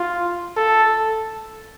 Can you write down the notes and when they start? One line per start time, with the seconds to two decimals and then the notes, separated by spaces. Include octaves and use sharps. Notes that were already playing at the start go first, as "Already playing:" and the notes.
Already playing: F4
0.57 A4